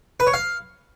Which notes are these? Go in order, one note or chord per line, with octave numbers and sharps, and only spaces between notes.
B4
C#5
F5